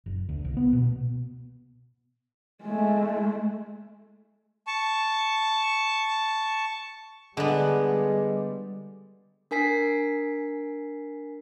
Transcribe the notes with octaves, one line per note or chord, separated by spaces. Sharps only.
F#1
D2
C2
B3
B2
G#3 A3
A5 C#6
D3 G3 G#3 B3
D4 A#4 G#5 B6 C7